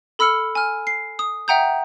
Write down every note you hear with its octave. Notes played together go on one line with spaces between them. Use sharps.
A4 B5 E6 F6 C#7
G#5 F6
C7
D#6
E5 F#5 G5 A#5 D#6 G6